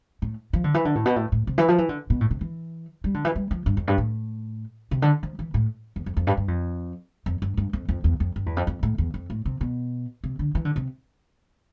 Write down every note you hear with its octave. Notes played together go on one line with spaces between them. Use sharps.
A2
F3
D3
E3
D3
A2
B2
A2
A2
C3
E3
F3
E3
D3
B2
A2
C3
E3
G3
D3
E3
G3
F3
G2
F2
G2
A2
C3
D3
F3
E3
A2
E2
F2
F2
G2
G2
F2
F2
G2
G2
F2
F2
E2
F2
G2
E2
F2
F2
A2
E2
F2
A2
C3
B2
C3
D3
E3
D3
C3